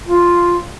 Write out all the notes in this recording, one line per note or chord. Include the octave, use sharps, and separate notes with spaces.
F4